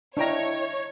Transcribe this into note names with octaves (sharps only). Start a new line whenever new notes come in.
D4 E4 C#5 D#5 G5 A5 A#5